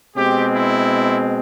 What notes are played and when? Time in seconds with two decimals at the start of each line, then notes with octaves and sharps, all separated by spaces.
0.16 B2 G#3 C4 G4
0.52 E4